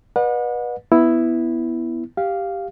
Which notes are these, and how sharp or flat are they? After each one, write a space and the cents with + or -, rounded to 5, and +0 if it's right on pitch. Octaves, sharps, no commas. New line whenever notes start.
B4 -25 D5 +45 F#5 -35
B3 +0 E4 +0
G4 +0 F5 +0